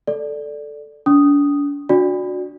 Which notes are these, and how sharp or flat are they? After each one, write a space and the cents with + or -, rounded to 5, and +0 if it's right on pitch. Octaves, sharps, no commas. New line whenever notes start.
A4 +0 D5 +0
D4 -40 D#6 +0
D4 +0 F#4 -20 D5 +0